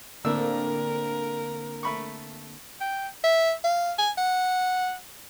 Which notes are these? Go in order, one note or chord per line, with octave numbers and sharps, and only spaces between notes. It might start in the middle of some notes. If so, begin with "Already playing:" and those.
A2 D3 A#3 C4 D4 A#4 E6
A3 B5 C#6
G5
E5
F5
G#5
F#5